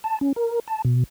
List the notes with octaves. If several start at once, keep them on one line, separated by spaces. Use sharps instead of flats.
A5
C#4
A#4
A5
B2